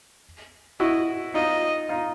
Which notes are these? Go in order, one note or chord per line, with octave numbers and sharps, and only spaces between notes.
E4 F#4 D#5
D#4 F4 D#5
D#4 F4